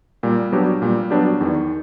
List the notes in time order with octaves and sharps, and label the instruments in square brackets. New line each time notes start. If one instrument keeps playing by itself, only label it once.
[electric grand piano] A#2 [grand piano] G3
[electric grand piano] F#3 B3 D4 G4
[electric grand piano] A#2 [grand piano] G3
[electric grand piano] F#3 B3 D4 G4
[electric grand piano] E2 [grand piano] D#3